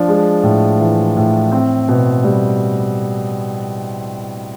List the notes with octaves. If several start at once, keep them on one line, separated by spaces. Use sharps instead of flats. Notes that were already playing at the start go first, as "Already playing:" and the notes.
Already playing: F3 D4
G#3
A2
E3
A2
C4
B2
G3